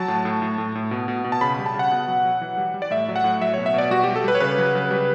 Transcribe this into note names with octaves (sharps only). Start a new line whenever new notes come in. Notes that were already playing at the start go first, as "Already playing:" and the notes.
Already playing: F#3 A5
A2
A2
A2
A2
A2
B2
B2
B2
A5
C#3 B5
B5
G3
A5
C#3
F#5
B2
F#3
F#3
E3
G3
G3
D5
A2 E5
F#3
F#5
A2
F#3 E5
C#5
B2
E5
B2 D5
G3 F#4
G4
G3
A4
G3 B4
C#5
C#3 B4
F#3
C#3
G3